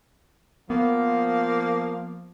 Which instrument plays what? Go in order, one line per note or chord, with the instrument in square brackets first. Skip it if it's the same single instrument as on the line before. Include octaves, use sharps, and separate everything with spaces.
[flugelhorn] F3 [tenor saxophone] A#3 [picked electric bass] B3